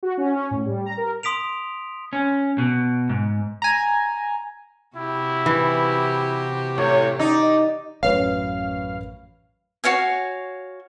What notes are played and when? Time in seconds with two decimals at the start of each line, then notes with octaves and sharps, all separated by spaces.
0.03 F#4
0.18 C#4
0.36 C#4
0.51 A2
0.66 G3
0.86 A#5
0.97 A#4
1.23 C6 D#6 B6 D7 F7
2.13 C#4
2.58 B2
3.09 G#2
3.62 G#5 A#5
4.96 C3 E4 F#4 G4
5.46 E3
6.78 A2 C#5
7.20 D#4 D5
8.03 A1 F#2 B4 C#5 F5
9.84 F#4 C#5 F5 G#5